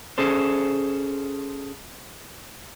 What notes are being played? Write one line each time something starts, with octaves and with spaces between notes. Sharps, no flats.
C#4 G#4 A4 C5